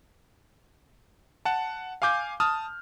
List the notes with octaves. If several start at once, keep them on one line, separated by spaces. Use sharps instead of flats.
F#5 A5
F5 G#5 D6 G6
A5 D#6 F6